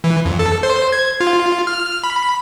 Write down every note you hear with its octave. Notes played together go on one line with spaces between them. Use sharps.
E3
F2
A4
C5
G#6
F4
F6
B5